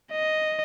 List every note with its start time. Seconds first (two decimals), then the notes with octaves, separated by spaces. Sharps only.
0.12 D#5